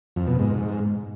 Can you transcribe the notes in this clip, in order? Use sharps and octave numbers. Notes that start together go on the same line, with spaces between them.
F2
B2
G#2